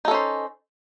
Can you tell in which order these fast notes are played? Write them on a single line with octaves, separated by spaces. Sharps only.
D#4 A4 C#4 C5